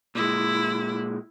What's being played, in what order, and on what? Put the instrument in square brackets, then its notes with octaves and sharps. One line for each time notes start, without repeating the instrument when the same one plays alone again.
[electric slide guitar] A#2 G#3 [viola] E4